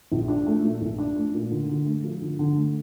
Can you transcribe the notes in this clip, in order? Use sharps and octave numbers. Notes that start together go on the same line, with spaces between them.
A#1
D4
A3
A#2
A#1
D4
A3
A#2
D3
D3
A3
F3
D3
D3
A3